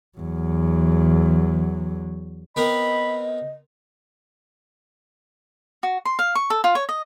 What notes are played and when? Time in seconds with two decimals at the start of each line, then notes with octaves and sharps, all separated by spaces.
0.18 E2 F#3
2.56 B3 C4 A#4 D#5 B5
5.83 F#4
6.05 C6
6.19 F5
6.35 C#6
6.50 A4
6.64 F4
6.75 C#5
6.89 D#5